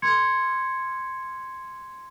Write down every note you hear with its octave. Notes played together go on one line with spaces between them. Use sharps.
C6 G#6 C#7